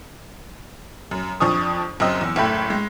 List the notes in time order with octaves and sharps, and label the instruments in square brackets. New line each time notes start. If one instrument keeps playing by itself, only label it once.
[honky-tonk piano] F#2
F2 F3 D4 C#6 D#6
F#1 F#2 C4 D#5 E6
E2
F#1 A2 A3 G5 B5
G#3